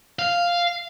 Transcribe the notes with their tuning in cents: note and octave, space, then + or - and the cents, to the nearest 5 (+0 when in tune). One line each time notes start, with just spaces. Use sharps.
F5 -5